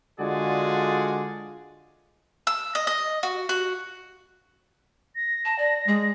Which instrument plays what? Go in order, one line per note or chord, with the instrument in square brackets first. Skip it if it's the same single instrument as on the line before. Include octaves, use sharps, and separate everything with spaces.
[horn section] D3 G#3 F4 F#4 G#4 D5
[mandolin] E6
D#5
D#5
F#4
F#4
[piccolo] A#6
[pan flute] A5
D5
[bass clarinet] G#3 [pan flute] G#4